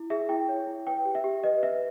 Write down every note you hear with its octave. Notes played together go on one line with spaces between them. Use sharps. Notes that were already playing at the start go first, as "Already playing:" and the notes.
Already playing: E4
G#4 E5
E4 G5
C#5
E4
B4 G5
G4
E5
G4
B4 D#5
B4 E5